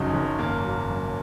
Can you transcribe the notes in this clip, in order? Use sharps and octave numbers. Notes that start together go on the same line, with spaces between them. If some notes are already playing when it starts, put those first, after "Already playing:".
Already playing: F#1 F#2 F#3 C#4 D#4
F#1
G#1 A#3
F#3
F#2